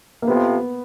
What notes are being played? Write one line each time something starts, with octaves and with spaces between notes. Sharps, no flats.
A#3
F2 C3 F3 B3